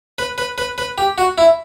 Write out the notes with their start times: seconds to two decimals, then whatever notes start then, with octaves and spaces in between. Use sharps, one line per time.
0.18 B4
0.38 B4
0.58 B4
0.78 B4
0.98 G4
1.18 F#4
1.38 E4